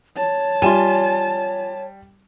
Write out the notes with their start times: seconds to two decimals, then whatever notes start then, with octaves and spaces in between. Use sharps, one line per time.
0.17 C#5 A5
0.62 G3 F4 E5 G#5 E7